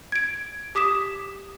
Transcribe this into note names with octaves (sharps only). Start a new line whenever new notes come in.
G#6 D7
G4 D6 D#6 B6 E7